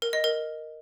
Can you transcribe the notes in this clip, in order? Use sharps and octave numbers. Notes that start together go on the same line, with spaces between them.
A#4
D#5
A#4